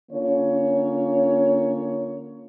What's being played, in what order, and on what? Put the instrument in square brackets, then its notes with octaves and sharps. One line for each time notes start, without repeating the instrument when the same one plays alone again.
[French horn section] D3 A#3 C#4 F4 C#5